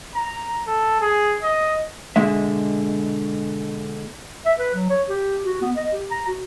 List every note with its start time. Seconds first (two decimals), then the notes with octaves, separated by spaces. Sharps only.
0.15 A#5
0.67 A4
1.01 G#4
1.43 D#5
2.16 B2 D3 G#3 E5
4.46 E5
4.59 B4
4.74 F#3
4.90 C#5
5.09 G4
5.44 F#4
5.62 B3
5.77 D#5
5.92 G4
6.11 A#5
6.27 F#4